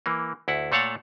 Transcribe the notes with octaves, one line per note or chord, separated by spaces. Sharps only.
E3 A#3
D2 E4 F#5
A#2 A3 A4 C#5 F5 F#5